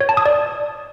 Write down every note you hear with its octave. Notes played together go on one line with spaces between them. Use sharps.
C#5
A5
D#6
D5